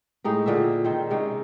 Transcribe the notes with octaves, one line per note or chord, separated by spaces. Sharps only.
A2 G#3 D#4 G4
A#2 D3 G#4 E5
D#3 C4
C3 G#3 C#4 D#4